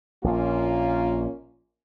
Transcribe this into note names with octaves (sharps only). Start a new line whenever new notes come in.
A#1 A#2 A#3 C#4 F4